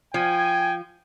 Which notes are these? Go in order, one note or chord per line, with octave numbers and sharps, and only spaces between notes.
F3 G5 G#5